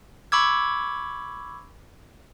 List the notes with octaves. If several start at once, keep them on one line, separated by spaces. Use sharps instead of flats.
B5 C#6 D6 E6 G#6